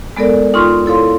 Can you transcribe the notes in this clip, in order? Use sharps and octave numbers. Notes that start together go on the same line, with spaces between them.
G#3 B3 A4 A#4 D5
D#2 D#4 F4 C6 C#6 F6
E4 A4 C#5 F5 C6